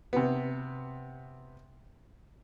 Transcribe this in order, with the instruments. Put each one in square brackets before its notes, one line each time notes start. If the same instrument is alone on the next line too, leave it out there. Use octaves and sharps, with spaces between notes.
[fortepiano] C3 B3